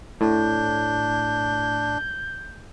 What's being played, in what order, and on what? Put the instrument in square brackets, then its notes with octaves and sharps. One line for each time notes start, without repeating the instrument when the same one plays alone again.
[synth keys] A2 [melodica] D4 [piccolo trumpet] G6